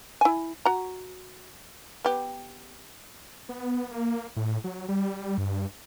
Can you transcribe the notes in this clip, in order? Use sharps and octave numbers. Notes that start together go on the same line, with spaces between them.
E4 G#5
F#4 A#5
B3 G4
B3
A#3
A2
F#3
G3
G2